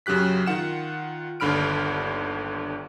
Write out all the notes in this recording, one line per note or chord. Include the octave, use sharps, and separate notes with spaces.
F#2 C#3 F#3 G4 F#6 B6
D#3 F4 F#5 E7
G1 D#2 D3 B5 F6 D7